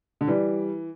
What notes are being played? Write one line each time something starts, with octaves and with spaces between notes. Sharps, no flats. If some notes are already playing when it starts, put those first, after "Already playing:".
D3
E3 G3